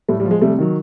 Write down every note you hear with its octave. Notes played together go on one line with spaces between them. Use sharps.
A2 G3 A3
G3
F3
G#3
C3 G3 A3
D#3 F#3